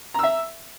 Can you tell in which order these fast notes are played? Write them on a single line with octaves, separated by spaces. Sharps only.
A#5 E6 E5